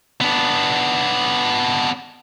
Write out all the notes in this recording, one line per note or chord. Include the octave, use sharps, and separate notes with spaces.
B3 D4